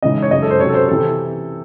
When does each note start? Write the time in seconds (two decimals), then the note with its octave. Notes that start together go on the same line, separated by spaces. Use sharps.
0.02 C#3 E3 G#3 D#4 D#5
0.22 C#5
0.30 F#2 C#3 G#3 D#4 D#5
0.42 A4
0.51 C5
0.60 C3 F#3 C#4 C#5
0.69 A4
0.75 C5
0.89 C3 E3 A4